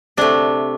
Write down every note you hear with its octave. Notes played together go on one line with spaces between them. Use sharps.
C3 A3 D4